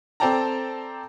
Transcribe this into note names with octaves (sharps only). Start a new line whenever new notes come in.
C4 A4 D5 G5 A5 A#5